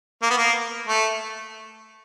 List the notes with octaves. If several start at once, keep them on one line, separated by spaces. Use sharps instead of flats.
A#3
B3
A#3
A3